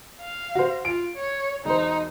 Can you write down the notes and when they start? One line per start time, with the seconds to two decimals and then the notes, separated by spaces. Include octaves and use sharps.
0.22 F5
0.55 F#4 C5
0.85 F4 D7
1.16 C#5
1.65 E1 D#4 C5